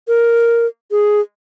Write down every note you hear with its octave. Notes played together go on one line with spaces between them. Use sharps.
A#4
G#4